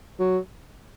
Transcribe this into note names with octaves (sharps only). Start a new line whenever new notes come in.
F#3